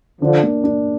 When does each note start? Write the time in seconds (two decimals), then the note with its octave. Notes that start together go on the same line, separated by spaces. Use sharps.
0.21 D3 F3 D4
0.43 A#3
0.64 D4